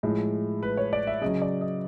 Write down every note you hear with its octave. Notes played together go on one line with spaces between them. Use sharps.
A2 F3 G#3
B4
C#5
D5
E5
C#3 F#3 D#5
D5
D#5